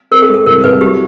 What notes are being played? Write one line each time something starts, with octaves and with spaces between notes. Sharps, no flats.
C4 A#4
A4
G#3
A4
C2 A#4
C2 B4
F#3 G4